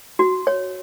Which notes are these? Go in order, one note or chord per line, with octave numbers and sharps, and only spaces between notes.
F#4
C#5